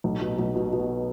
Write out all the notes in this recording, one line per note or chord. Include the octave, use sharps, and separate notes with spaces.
B1
B2
B1
B2
B2